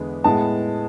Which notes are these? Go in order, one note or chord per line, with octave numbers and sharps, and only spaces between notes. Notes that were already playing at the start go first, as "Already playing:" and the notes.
Already playing: E2 D3 G#3 B3
A2 G#3 B3 A5